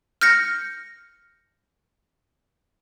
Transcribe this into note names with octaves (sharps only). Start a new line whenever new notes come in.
F6 G6 A#6 C#7